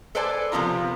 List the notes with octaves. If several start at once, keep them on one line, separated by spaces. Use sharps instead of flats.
A4 B4 C5 D5 G#5 A5
C3 F3 B3 F4 A#4